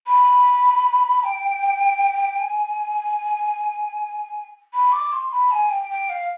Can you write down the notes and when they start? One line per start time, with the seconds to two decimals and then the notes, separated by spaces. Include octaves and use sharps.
0.06 B5
1.23 G5
2.40 G#5
4.73 B5
4.91 D6
5.12 C6
5.31 B5
5.51 G#5
5.69 G5
5.90 G5
6.09 F5